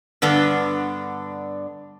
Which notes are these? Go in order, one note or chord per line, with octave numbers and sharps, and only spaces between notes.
G2 D3 B3 D4